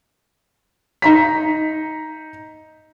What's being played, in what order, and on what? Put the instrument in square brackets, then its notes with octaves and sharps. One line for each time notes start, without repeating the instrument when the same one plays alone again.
[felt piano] D#4 A#5 B6